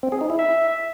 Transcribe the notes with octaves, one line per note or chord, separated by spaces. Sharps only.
C4
G#4
D#4
E4
E5